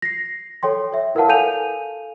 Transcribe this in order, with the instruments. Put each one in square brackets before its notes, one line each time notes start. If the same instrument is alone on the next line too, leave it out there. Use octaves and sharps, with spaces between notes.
[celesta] A#6 C7
A4 C#5 G5 C6
C#5 E5
E4 A#4 B4 F5 F#5 A5
A4 F5 G#5 G6 D#7 F7